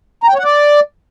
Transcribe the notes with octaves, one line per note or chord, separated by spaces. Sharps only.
A#5
G5
C#5
F#5
D5